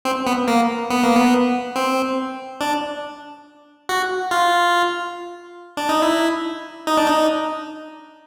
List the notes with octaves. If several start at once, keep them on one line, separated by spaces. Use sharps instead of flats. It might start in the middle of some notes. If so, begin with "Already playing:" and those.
C4
B3
A#3
B3
A#3
B3
C4
D4
F#4
F4
D4
D#4
E4
D#4
D4
D#4